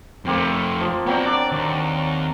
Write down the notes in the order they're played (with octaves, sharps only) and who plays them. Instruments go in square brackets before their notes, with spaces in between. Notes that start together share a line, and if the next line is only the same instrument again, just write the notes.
[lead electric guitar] F2 A3 [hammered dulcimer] A#3 C4 C5
[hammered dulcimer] F3
[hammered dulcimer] F#3 C4 [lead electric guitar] B3 D5
[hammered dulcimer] D4 [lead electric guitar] D5
[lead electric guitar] D#2